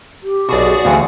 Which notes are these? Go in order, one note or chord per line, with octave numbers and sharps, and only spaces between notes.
G4
B1 B2 F#4 G#4 D5
D2 A2 D3 E3 F5 F#5 G#5